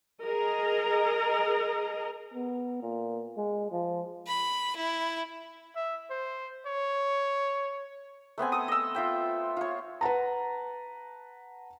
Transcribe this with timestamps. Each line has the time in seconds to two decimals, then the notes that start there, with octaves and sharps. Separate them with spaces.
0.24 G#4 A#4 D#5 A#5
2.34 B3
2.82 A#2
3.37 G#3
3.72 F3
4.27 B5
4.76 E4
5.76 E5
6.10 C5
6.66 C#5
8.38 A3 B3 C4 G#5
8.52 A4 D#6
8.68 D#5 E6
8.95 F4 E5 G5
9.57 F4 C#5
10.01 B4 F#5 A5 A#5